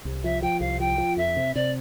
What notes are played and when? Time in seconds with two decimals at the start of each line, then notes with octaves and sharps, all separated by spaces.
0.05 C2
0.24 F3 E5
0.42 F3 G5
0.60 C2 F5
0.80 F3 G5
0.98 F3
1.17 F2 E5
1.37 C3
1.55 C3 D5